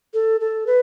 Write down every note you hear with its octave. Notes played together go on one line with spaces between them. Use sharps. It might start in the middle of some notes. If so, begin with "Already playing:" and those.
A4
A4
B4